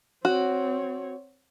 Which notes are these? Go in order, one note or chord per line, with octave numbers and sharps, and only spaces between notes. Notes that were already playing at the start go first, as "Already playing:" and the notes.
C4 F#4 C#5